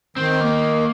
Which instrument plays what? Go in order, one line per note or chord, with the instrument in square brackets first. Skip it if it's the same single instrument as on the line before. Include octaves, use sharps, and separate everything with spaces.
[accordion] D#3 [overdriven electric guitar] C4
[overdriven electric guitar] A#3